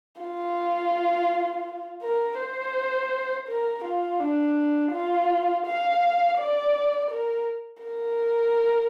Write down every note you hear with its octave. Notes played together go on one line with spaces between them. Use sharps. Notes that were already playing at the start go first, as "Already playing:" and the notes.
F4
A#4
C5
A#4
F4
D4
F4
F5
D5
A#4
A#4